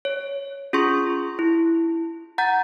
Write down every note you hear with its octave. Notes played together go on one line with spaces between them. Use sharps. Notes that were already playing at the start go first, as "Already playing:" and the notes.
C#5
C#4 F4 G#4 C6 C#6
E4
F#5 A#5 G6 A6